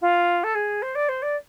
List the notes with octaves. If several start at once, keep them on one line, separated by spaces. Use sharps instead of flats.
F4
A4
G#4
C5
D5
C5
D5